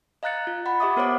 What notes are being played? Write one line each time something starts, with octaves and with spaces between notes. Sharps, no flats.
D#5 F5 A#5 F#6 A6 C#7
F4
F#5 B5
G4 D#5 E5 D6 D#6
B3 A#4 C5 C#5 F#5 D6